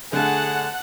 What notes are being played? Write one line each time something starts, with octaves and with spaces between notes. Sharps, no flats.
D3 A3 G#4 F#5 A5